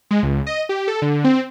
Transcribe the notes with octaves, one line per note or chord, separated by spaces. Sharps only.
G#3
C#2
D#5
G4
A4
D3
C4